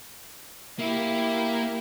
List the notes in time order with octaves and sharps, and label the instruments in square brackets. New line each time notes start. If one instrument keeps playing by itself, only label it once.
[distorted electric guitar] A#3 [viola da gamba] E4 G4